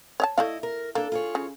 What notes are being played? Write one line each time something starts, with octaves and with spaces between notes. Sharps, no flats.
C#5 D#5 A5
A3 E4 D5 D#5 F5
A#4
A#3 D4 A4
F4 G#4 C#5
C#3